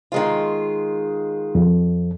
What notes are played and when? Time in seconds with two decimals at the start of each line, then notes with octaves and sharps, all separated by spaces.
0.12 D#3 G#3 F4
1.55 F2